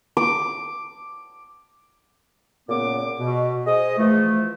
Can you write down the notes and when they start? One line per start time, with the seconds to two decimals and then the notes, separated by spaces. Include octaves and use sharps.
0.17 D6
2.69 A#2 C#3 B3 D6
3.19 B2
3.66 G#4 C5 D#5
3.98 E3 F3 A3